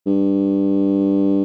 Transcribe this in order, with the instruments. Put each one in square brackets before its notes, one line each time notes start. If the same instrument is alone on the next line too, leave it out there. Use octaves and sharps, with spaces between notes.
[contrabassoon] G2